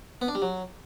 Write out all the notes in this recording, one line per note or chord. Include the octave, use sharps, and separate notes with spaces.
B3
D4
G3
F#3